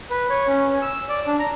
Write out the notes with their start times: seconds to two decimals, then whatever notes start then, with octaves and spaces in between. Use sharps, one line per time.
0.11 B4
0.30 C#5
0.47 C#4
0.69 C#4
0.82 E6
1.09 D5
1.27 D4
1.39 A#5